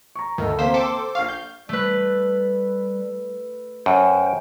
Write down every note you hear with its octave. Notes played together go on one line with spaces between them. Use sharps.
A#5 C#6
D2 D#3 A4
E2 A#3 C4 C5 B6
A4 C5 G5 D6
A#1 F5 C#6
G6
G3 A3 B4
F#2 C5 G5